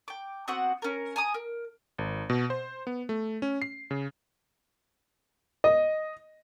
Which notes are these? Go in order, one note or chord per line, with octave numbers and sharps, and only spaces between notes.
G5 D6
B3 C4 F#4 F#5
C#4 A#4
G#5 A#5 D#6
A#4
G#1
B2
C5
B3
A3
C#4
C7
C#3
D#5